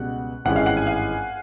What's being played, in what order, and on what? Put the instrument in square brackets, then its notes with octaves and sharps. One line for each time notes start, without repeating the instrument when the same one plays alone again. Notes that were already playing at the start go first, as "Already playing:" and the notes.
Already playing: [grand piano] C#2 B2 G3 [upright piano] F#5
[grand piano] G#1 G2 E3 G#3 C#4 [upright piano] F#5
[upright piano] F5
F#5
G#5
F5